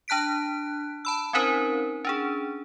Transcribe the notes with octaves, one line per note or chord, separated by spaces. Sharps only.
D4 A5 F#6 B6 D7
A5 B5 E6
C4 C#4 D#4 A#4 C5
C#4 D4 G#4